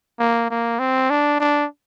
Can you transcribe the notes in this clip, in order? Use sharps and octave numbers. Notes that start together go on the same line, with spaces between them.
A#3
A#3
C4
D4
D4